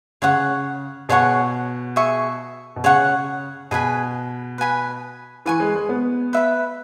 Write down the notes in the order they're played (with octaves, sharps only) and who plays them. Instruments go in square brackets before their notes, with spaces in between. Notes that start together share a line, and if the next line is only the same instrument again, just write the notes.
[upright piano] C#3 [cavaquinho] G#4 C#5 F#5 C#6
[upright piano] B2 [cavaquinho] G#4 C#5 F#5 C#6
[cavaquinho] G#4 E5 C#6
[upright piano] B2
[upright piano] C#3 [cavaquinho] G#4 C#5 F#5 C#6
[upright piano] B2 [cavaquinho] G#4 B4 G#5 B5
[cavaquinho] B4 G#5 B5
[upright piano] E3 [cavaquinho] B4 G#5 C#6
[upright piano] G#3
G#3
B3
[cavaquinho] B4 E5 B5